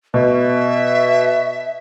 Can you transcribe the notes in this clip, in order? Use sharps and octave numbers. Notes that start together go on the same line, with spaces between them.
B2 E5